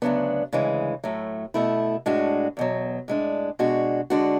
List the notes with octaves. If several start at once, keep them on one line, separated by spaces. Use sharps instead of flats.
D2 C#3 F#3 B3 D4
D2 C#3 E3 G#3
A2 F#3 A3
B2 A3 E4
A2 G#3 D4 F#4
E2 B2 F#3
A2 G#3 D4
B2 G#3 D4 F#4
D3 G#3 D4 F#4